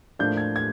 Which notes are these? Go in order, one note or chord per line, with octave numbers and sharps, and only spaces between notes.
A2 F3 A#3 D4 G6
G#6
G#6